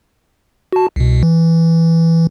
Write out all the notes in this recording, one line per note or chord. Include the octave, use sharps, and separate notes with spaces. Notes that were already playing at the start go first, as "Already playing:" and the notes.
F#4 A5
C2 B2
E3